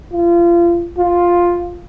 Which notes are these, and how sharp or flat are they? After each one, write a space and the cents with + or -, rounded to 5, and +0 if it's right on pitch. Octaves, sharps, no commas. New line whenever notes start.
F4 -30
F4 +5